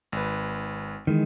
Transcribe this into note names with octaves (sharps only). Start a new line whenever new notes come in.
G#1 B4
D#3 E3 G#3